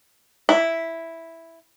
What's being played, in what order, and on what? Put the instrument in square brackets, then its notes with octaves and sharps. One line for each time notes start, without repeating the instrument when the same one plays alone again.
[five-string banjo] E4